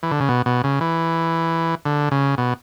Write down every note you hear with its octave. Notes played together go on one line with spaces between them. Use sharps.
E3
D3
C#3
B2
B2
C#3
E3
D3
C#3
B2